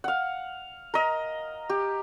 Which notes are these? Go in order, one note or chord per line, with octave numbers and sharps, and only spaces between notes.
F5 F#5
A#4 D#5
G4